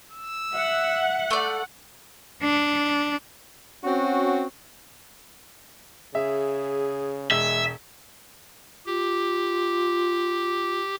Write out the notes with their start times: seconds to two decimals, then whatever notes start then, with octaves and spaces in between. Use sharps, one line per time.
0.11 E6
0.55 E5 F#5
1.31 A3 D5
2.43 D4
3.84 C4 C#4 F#4
6.15 C#3 G#4 E5
7.31 E1 G#3 E5 E6 G7
8.86 F4 G4